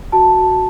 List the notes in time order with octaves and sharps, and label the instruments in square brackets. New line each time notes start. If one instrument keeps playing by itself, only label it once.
[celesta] F#4 A5